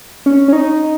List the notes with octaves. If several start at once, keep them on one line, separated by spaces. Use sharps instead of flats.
C#4
C#4
D#4